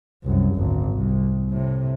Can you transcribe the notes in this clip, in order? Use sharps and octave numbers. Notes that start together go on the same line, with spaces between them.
C2 F#2
G#1 D2
C2
A2 C3